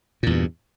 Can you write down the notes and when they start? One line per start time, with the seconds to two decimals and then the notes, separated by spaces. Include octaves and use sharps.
0.23 A#2
0.27 E2
0.30 G2